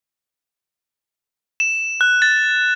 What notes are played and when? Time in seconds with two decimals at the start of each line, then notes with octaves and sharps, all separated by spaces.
1.60 E7
2.01 F#6
2.22 A6